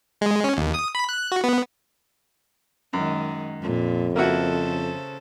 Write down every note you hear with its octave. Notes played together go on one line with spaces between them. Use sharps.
G#3
C#4
D#2
D#6
B5
F#6
F#4
B3
F#2 D#3 G#3
F2 A#2
C#3 A#3 E4 F#4 A4 C5